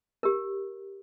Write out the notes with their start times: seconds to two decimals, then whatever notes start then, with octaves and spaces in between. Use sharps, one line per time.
0.23 G4 A#4